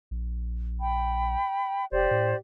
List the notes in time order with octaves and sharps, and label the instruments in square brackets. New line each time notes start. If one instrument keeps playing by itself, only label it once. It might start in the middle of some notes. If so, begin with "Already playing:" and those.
[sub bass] A#1
[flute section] G5 B5
[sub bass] F1 [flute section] G4 C5 D5
[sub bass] A2